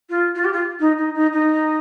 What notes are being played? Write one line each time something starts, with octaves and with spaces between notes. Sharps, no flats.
F4
F4
G4
F4
D#4
D#4
D#4
D#4